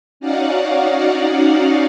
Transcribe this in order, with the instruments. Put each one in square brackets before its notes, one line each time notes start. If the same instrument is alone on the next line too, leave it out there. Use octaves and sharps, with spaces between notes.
[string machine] C#4 D#4 F#4 D5 F5 F#5